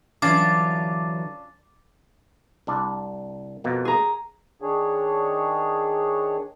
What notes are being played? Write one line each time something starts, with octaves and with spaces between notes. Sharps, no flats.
D3 E3 F#3 C#4 D4 F4 D6 A6
C2 D4 D5
F2 B2 A#3
G#4 A#5
D#3 D4 G#4 C#5